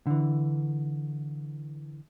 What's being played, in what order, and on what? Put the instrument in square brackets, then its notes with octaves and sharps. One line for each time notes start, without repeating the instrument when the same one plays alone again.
[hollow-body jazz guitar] D3 E3